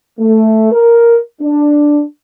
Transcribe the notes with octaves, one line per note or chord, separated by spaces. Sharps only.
A3
A#4
D4